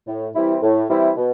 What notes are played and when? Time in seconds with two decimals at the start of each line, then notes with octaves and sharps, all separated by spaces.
0.07 A2
0.35 E3 G3 C4 E4
0.63 A2
0.89 E3 G3 C4 E4
1.17 B2